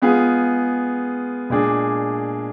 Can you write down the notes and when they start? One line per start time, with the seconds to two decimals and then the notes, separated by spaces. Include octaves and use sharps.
0.02 G#3 B3 F4 G#4
1.50 A#2 G#3 D4 G#4